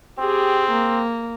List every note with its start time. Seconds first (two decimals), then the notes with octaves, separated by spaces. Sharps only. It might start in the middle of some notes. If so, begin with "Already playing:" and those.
0.19 C4 G4 G#4
0.71 A#3